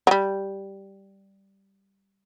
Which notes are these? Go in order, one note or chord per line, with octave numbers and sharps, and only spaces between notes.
F#3
G3